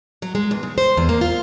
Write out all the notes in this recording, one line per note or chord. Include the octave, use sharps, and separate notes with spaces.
F#3
G#3
E2
C#3
C5
E2
A#3
F4